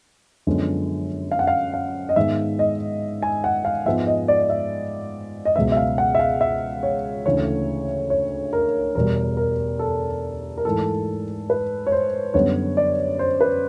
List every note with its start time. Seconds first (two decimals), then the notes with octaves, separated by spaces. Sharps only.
0.47 F#2 D3 F3 G#3 B3
1.32 F5
1.39 F#5
1.47 F5
1.74 F5
2.09 D#5
2.16 G#2 D#3 G#3 B3 E5
2.59 D#5
3.22 G#5
3.44 F#5
3.65 F5
3.86 G#2 F3 G#3 B3 E5
4.07 D#5
4.28 D5
4.50 E5
5.45 D#5
5.56 C#2 B2 F#3 B3 E5
5.72 E5
5.77 F5
5.98 F#5
6.15 E5
6.19 F5
6.41 E5
6.83 C#5
7.26 D2 C#3 E3 A3 C#5
8.10 C#5
8.53 A#4
8.95 E2 B2 G3 A#4
9.37 A#4
9.79 A4
10.58 A#4
10.65 G#2 E3 A3 A4
11.50 B4
11.87 C#5
11.92 C5
12.34 F#2 D3 G3 B3 C#5
12.77 D5
13.19 C5
13.41 B4